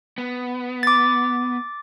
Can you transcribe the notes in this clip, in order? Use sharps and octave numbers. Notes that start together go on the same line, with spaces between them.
B3
D6 A6